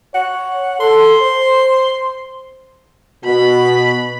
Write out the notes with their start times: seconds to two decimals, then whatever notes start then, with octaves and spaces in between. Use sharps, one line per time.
0.15 C#5 F#5
0.80 A4 C6
1.22 C5
3.24 B2 F#4 B5